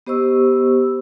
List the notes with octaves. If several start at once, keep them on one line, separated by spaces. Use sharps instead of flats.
B3 G4 C5 D#5 C#6 E6